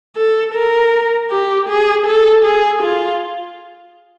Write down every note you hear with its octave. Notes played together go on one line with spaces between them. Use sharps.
A4
A#4
G4
G#4
A4
G#4
F4